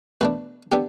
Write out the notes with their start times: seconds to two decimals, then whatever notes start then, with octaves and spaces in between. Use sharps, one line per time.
0.21 B2 A3 D4 B4
0.72 D3 B3 D4 G4